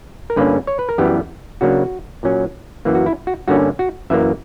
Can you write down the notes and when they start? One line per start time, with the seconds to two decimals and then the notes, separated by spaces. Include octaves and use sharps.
0.30 A#4
0.36 G2 D3 A#3 C#4 B4
0.67 C#5
0.79 B4
0.89 A#4
0.98 F#2 E3 G3 B3 G4
1.61 C#3 F#3 A#3 D4 F#4
2.23 A#2 F#3 C#4
2.85 F#2 E3 A#3
2.95 F#4
3.06 E4
3.27 F#4
3.48 G2 D3 A#3 C#4 F#4
3.79 F#4
4.10 F#2 E3 A#3 E5